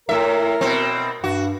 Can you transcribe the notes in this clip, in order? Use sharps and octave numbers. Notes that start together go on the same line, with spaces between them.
A2 A#4 E5
B2 C4
G2 F#4